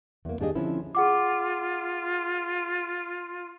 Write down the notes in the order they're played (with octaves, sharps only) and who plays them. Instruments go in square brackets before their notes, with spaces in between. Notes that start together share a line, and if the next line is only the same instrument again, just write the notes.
[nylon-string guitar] E2 A#3
D#2 D4 G4 G#4 D#5
D3 F3 C4 C#4 E4
[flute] F4 [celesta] G#4 F#5 D6